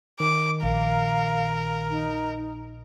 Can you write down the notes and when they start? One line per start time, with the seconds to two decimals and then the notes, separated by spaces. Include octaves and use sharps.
0.20 D#3 D6
0.63 A#1 A#4 F5
1.90 D#4